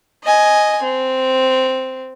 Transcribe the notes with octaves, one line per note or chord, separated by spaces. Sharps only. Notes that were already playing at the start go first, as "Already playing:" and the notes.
D#5 G#5
C4